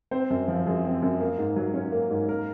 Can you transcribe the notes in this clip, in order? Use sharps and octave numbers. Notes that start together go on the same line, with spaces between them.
C4 C5
F#2
F3
F#2 G#4
C4
F#2
A#3
G#2
F#3
C#4
A#3
G#2
A#3 A#4